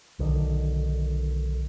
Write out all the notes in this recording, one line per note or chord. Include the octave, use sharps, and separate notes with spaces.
B1 D3 D#3